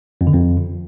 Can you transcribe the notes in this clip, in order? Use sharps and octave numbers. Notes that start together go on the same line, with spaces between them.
F2
D3
F2